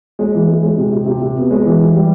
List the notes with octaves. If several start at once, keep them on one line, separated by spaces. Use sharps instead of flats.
G#3
E3
G#3
G#3
C3
C3
C3
C3
B3
G#3
E3
E3
G3